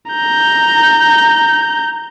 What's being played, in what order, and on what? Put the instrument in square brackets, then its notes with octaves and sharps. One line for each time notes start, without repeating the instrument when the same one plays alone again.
[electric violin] A#5 G6